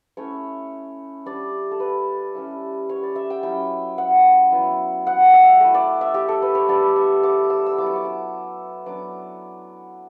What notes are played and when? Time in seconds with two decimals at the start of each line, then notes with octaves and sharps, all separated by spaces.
0.17 A3 C#4 E4 C#5
1.26 G3 D4 D5
1.71 A4
1.80 B4
2.35 G3 C#4 E4
2.89 C#5
3.03 D5
3.16 E5
3.30 G5
3.43 F#3 C#4 E4 G5
3.98 F#5
4.52 F#3 B3 E4
5.07 F#5
5.33 E5
5.60 A3 E4
5.74 D5
6.01 E5
6.14 G4
6.28 A4
6.42 B4
6.55 C#5
6.68 G3 B3 D4 D5
6.96 E5
7.23 D6
7.50 E6
7.66 E6
7.78 F#3 B3 E4 D6
7.86 C#6
7.96 D6
8.05 E6
8.86 F#3 B3 D4 D6